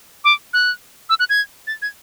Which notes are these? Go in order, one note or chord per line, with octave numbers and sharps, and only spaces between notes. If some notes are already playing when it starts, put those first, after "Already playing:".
D6
F#6
E6
F#6
G#6
A6
G#6